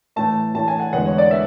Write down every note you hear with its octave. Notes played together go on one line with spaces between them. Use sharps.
A2 E3 A3 A5
A2 E3 A3 A5
G#5
F#5
E2 D3 G#3 B3 F#5
C#5
D5
B3 E5